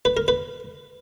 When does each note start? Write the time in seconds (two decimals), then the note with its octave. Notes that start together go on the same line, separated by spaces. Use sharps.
0.05 B4
0.17 A#4
0.28 B4